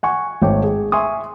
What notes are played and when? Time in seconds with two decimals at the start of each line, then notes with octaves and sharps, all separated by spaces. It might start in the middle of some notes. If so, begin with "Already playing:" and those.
0.03 F#5 G#5 C#6
0.42 G#1 A3 C#5 G5 D6
0.64 G#4
0.92 E5 G#5 C6 C#6 D#6